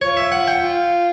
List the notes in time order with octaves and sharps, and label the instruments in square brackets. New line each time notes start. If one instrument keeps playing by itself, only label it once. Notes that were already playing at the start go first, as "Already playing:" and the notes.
[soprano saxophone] F4 [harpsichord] C#5
[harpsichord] E5
F#5
G5
[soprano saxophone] F4